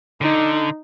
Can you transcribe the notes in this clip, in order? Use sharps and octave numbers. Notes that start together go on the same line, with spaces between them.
D3 D#4